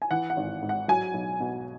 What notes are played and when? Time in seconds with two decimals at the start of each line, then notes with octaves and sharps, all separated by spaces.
0.02 G#5
0.11 E3 F#5
0.30 F#5
0.37 G#1
0.63 G#2
0.69 F#5
0.88 F#3 G#5
1.14 B1
1.40 B2